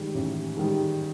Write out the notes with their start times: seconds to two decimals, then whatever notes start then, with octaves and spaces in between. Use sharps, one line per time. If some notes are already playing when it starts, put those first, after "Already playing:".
Already playing: G#2 D#3 G3
0.15 A1
0.57 G#2 D#3 G3